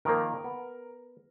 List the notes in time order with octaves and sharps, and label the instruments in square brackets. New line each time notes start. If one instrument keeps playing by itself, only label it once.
[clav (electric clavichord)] D#3 F3 A#3 [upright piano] A#4
[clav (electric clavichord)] B3